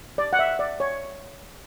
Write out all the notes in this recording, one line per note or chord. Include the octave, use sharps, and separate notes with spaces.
D5
F#5
E5
D5
C#5